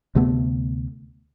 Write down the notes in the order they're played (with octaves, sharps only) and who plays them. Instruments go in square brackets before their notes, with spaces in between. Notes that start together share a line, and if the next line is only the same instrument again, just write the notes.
[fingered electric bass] D2 C3 A3 B3